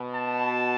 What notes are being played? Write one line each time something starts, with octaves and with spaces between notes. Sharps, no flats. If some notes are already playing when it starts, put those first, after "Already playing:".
Already playing: B2
A5